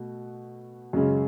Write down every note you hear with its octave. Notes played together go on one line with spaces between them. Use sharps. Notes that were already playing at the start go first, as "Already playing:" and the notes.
Already playing: B2 A3 F#4
F#2 C#3 G#3 C#4